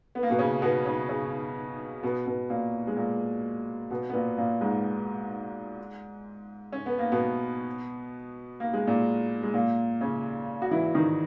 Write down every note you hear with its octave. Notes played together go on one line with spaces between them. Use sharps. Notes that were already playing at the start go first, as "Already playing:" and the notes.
B3
A#3
B2 B3
C#3 C#4
B2 B3
C#3 C#4
C#3 C#4
B2 B3
B2 B3
A#2 A#3
G#3
A#2 A#3
B2 B3
B3
A#2 A#3
A#2 A#3
G#2 G#3
C#4
B3
A#3
B2 B3
A#3
G#3
A#2 A#3
G#3
A#2 A#3
C#3 C#4
F#4
E3 E4
D#3 D#4